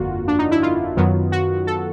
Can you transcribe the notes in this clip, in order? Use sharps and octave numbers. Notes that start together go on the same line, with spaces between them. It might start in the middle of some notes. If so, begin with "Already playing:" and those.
Already playing: G1 F2 D3 A#3 F4 F#4
D4
D#4
E4
F4
F#2 D#3 F#3 B3
F#4
A4